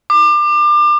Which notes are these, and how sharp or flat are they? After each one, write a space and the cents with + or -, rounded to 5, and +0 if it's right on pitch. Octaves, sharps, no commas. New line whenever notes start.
D6 +30